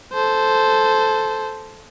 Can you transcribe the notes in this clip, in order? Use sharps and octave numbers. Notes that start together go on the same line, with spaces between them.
A4 C5